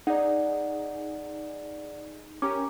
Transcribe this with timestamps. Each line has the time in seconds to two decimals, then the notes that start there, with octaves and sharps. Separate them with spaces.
0.07 D#4 G#4 D5 F#5
2.42 C#4 G4 A#4 A#5 D6